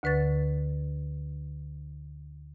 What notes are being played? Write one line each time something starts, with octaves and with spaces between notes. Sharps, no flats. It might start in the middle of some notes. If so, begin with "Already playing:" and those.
D2 D3 B4 C#6 A6